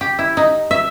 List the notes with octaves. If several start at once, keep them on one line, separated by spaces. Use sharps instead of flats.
G4
E4
D#4
E5